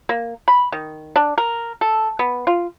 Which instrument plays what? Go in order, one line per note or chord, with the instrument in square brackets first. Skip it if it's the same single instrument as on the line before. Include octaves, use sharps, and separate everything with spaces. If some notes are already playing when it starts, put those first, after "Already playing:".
[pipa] A#3
B5
D#3
D4
A#4
A4
B3
F4